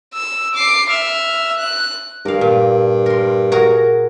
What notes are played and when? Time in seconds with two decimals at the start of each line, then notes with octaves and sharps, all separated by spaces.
0.14 E6
0.54 D6 C7
0.89 E5 F6
1.58 F#6
2.25 G2 A#4 F5
2.41 A#2
3.06 A#4 C6
3.52 F#4 G#4 A#4